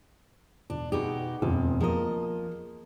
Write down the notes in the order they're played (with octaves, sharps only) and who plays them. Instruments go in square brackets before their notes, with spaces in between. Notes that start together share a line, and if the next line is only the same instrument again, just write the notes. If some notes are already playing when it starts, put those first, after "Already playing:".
[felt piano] E1 [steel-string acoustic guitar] D4
[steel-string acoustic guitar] B2 D#4 G4 [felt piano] G#4
[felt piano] E1 [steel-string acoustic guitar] F2
[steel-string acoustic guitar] F3 D#5 [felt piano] A#3 G#4